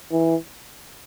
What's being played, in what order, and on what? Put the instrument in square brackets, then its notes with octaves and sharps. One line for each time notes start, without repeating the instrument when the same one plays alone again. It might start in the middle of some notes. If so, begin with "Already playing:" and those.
[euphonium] E3